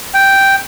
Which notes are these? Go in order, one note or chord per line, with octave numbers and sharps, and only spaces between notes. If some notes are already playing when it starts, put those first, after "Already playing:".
G5